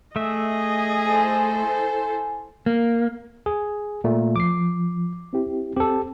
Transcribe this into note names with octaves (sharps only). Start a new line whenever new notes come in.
A3 G#4 D#5 E5
E4 A4 C5 G#5
A#3
G#4
A#2 A3
F3 D6 C7
C4 E4 G4
C4 G4 A4